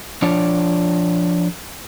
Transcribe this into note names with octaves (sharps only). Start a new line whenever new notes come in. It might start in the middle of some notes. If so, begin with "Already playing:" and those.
F3 D4 F4 C#5 D5